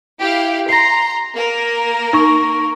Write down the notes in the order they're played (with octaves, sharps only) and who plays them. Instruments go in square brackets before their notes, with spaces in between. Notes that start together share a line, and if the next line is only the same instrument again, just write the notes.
[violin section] E4 G4 F5
[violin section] A#5 C6 [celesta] A#6 C7
[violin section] A#3 A#4
[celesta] D#4 C#6